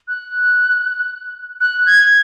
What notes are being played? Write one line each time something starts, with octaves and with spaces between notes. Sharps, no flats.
F#6
F#6
G#6